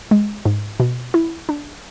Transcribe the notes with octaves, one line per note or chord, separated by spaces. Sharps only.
G#3
G#2
B2
E4
D4